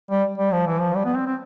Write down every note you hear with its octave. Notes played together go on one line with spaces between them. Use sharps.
G3
G3
F3
E3
F3
G3
B3
C4
C4